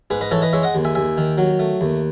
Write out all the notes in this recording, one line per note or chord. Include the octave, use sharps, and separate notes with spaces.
G#2 G#4 B4
B4 D#5
E3 A4 C#5
B4 D#5
G#3 C#5 E5
D#5 F#5
D#2
E5 G#5
D#2 E5 G#5
D#3
F#3
A3
D#2